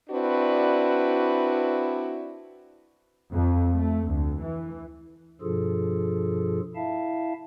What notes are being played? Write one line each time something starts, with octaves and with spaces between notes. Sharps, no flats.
C4 D4 E4 F#4 B4 D5
F2
A3
D2
E3
G2 B2 F3 F4 G#4 A4
E4 E5 F5 A5